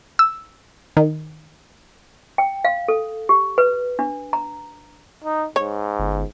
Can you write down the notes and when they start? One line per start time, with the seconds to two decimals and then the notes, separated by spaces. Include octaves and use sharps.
0.19 E6
0.97 D#3
2.38 G5
2.65 F5
2.88 A4
3.29 G4
3.58 B4
3.99 D4
4.33 A#5
5.24 D#4
5.56 G#2 C#5
5.99 G1